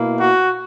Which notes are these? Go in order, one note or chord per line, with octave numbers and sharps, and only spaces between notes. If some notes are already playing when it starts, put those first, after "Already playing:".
Already playing: B2 A#3 E4
F#4